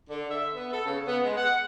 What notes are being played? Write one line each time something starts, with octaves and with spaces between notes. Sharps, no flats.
D3
E5
B3
A4
C#3
B3
G#3
F#5